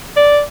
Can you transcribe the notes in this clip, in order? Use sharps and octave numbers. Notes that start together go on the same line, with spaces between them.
D5